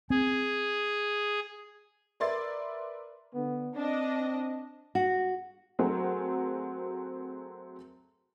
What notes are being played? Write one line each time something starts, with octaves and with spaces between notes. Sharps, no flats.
C4 G#4
A#4 B4 D5 E5 C6 A6
D3 B3
C4 D4 D#5
F#4
F#3 A3 C4 F#4 G#4 A#4